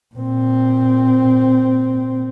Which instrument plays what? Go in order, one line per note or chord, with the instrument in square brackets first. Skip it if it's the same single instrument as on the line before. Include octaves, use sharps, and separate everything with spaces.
[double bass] A#2 C4